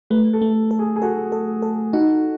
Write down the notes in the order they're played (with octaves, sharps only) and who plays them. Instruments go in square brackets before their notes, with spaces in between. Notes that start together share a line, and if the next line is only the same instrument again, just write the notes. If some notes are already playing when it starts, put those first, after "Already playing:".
[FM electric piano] A3 [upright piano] B4
[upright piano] A4
[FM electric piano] A3
A4
[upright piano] G#4
G#4
[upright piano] F#4 [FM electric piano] A4
[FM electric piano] A4
A4
[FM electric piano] D#4 [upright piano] F#4